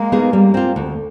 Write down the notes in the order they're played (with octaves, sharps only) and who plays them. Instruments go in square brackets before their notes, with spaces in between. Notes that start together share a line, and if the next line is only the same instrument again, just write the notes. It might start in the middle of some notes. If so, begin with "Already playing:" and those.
Already playing: [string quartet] G#3 A#3
[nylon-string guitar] B3 D#4 G#4
G3
C4 F4
D2